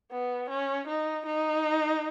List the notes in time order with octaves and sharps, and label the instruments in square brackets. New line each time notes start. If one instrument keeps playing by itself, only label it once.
[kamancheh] B3
C#4
D#4
D#4